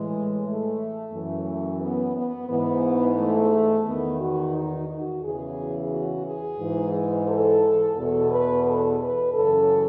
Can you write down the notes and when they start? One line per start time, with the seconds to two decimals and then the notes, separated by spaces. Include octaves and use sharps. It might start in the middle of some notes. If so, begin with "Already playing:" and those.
Already playing: A2 E3 G#3
0.44 A3
1.12 F#2 E3 A3
1.81 B3
2.15 B3
2.49 G#2 E3 B3
3.17 A3
3.86 E2 D#3 B3
4.20 F#4
4.54 D#4
4.88 F#4
5.23 E2 C#3 E3 G#4
5.91 F#4
6.25 G#4
6.59 G#2 E3
7.28 A4
7.96 E2 B2 A4
8.30 B4
8.64 A4
8.99 B4
9.33 F#2 C#3 E3 A4